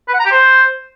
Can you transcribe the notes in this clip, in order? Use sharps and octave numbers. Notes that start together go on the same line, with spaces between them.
B4
F#5
A#5
G4
C5